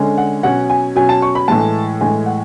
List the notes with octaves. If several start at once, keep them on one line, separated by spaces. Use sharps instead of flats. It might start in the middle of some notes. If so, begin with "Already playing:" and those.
Already playing: D3 G#3 C#4
F#5
B2 F#3 C#4 F#5
G#5
B2 F#3 C#4 G#5
A5
C#6
B5
A2 E3 G#3 A5
A2 E3 G#3 G#5
F#5